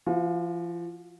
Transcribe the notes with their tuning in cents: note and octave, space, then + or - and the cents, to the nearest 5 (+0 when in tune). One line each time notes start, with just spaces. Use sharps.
F3 -35 F4 +40